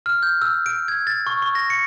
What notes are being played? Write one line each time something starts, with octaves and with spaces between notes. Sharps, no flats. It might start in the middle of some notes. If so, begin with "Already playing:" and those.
F6
G6
E6
D7
G#6
A6
C#6
C#6
A#6
C#7